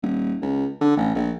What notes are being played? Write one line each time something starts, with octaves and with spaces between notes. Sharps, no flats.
D#1
C#2
D3
A1
A#1